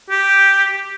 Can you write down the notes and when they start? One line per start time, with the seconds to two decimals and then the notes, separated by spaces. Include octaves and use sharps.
0.10 G4